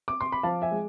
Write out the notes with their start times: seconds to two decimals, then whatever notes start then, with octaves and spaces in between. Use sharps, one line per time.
0.08 D6
0.21 C6
0.32 B5
0.43 F3 F5 A5
0.62 E5 G#5
0.71 G#3